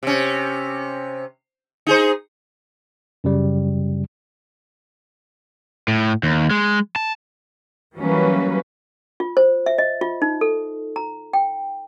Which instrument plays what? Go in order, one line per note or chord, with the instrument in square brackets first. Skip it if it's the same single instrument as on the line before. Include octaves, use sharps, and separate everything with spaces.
[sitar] C3 C#4
D#4 G#4 C5
[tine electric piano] F#2 C#3 G3
[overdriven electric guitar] A2
D#2
G#3
A5
[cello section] E3 F#3 G3 A#3 C#4 B4
[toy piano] F4
C5
E5
D#5
F4
D#4
A4
A#5
G5